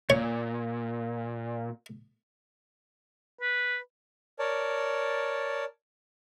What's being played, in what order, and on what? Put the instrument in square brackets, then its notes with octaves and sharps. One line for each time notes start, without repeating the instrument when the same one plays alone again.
[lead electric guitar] A#2 [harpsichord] C#5
[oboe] B4
[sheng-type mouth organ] A#4 C#5 D5 A5